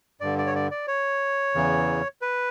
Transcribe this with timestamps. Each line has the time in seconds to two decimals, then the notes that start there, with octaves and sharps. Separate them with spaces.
0.21 G2 D3 D5
0.38 D5
0.46 C#5
0.55 D5
0.71 D5
0.88 C#5
1.55 E2 C#3 E3
2.22 B4